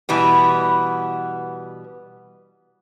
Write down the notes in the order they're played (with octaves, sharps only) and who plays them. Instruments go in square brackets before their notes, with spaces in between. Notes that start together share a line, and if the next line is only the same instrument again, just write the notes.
[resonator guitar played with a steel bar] B2 E3 G3 B3